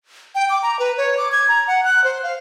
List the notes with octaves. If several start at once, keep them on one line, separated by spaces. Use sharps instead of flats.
G5
D6
A#5
B4
C#5
D6
G#6
A#5
F#5
F#6
C5
F5